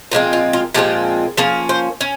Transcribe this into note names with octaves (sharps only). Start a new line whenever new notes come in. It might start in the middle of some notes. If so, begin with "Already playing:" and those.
A#2 F3 G#3 C4
F4
F4
A#2 F3 G#3 C4 G4
F3 A#3 C#4 G#4
C5
C#4